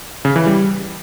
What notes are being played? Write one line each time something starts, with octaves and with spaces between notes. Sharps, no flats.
C#3
E3
G3